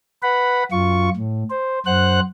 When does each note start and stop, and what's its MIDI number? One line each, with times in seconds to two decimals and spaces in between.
0.23 0.63 71
0.23 0.63 78
0.23 0.63 83
0.71 1.09 42
0.71 1.09 65
0.71 1.09 85
1.17 1.44 45
1.50 1.79 72
1.86 2.20 42
1.86 2.20 72
1.86 2.20 78
1.86 2.20 90